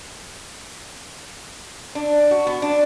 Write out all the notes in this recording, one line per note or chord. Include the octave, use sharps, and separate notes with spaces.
D4
F#4
B3
D4